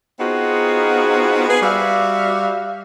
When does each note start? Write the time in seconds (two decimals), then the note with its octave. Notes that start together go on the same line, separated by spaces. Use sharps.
0.20 B3 C4 D#4 F4 F#4 G#4
1.48 G#4 B4
1.62 G3 F#4 D5 E5 F5